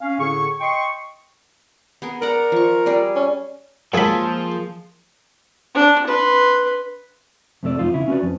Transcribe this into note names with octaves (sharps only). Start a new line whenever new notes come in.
C#4 F5
A2 D3 G#4 C#6
D#5 G5 C6 C#6
B3 G#4 A#4
A#4 D5 F#5 A#5
F3 C#6
G3 G#4 D5
C#4
F#2 F3 G#3 A#3 G#4 A4 B5
D4
B4 C6
F2 C3 A3 B3 A4 D5
F2 D#4 F4
C#3 E4
C#4 F#4 G4 B4 D5
F2